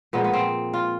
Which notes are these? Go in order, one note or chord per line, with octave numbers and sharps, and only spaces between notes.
A#2 F3 G#3 B3
B3
C4
F4